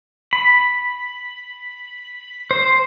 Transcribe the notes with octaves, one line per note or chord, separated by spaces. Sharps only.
B5
C5